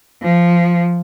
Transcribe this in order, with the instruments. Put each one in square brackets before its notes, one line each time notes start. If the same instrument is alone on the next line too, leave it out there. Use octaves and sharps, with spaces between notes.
[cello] F3